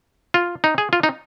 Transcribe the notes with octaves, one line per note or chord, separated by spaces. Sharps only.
F4
D#4
G#4
F4
D#4